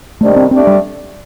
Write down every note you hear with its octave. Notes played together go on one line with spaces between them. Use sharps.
C3 D#3 G3 A3 D4
C4
A3 C4 D4 G4 D5
G3